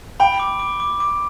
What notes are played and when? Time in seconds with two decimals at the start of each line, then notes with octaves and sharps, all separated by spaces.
0.20 G5 B5
0.40 D6
0.60 D6
0.80 D6
1.00 D6